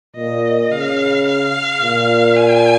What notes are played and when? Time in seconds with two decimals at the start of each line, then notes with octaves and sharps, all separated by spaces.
0.16 A#2 D#5
0.71 C#3 F5
1.27 F5
1.82 A#2
2.37 G#5